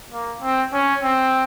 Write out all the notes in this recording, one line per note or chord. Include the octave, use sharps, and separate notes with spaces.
A#3
C4
C#4
C4